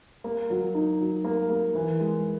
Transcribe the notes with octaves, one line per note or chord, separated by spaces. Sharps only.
A#3
F#3
D#4
F#3
A#3
A#3
E3
G#3